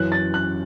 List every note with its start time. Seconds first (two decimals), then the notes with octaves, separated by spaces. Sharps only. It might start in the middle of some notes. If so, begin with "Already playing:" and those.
Already playing: F#2 E3 C#4 F#6
0.12 A6
0.34 F#6